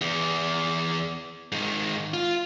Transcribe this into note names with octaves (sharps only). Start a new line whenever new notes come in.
E2
G#2 D#3
F4